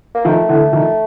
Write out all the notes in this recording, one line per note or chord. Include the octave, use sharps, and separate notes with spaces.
A#3
D#3 F3 A3
D3 E3
D#3 F3